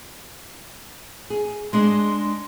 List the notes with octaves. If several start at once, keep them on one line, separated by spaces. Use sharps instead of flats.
G#4
G#3 D4 D#5 C6